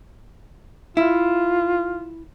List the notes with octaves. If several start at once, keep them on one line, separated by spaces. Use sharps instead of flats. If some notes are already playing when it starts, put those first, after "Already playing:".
E4 F4